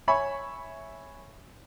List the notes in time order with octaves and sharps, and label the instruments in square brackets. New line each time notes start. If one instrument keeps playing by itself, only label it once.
[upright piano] C#5 E5 G#5 B5 C#6